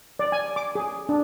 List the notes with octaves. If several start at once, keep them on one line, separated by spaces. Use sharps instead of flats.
D5
G#5
D6
G#4
D4